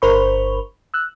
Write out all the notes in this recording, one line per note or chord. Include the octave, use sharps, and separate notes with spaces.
G1 A#4 C5 B5 C#6
E6 F#6